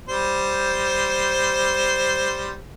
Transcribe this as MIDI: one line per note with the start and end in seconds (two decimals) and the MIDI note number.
0.09 2.59 55
0.09 2.59 72